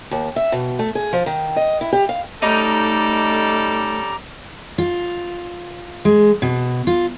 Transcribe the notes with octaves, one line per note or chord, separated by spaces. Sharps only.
D#2
E5
B2
A3
G#4
F3
D#3
D#5
E4
G4
F5
G3 A3 C#4 D#4 A4 A#5 D6
F4
G#3
B2
F4